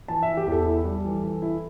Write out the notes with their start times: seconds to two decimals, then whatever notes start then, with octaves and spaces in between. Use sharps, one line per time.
0.08 E3 A5
0.23 E3 E5
0.37 G4
0.47 E2 A4
0.66 E4
0.85 G3
1.05 E3
1.24 E3
1.42 E4